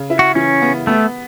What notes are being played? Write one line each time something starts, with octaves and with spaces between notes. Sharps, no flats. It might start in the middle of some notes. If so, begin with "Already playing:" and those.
Already playing: C#3
E4
F#4
E3 C#4
B3
A3 B3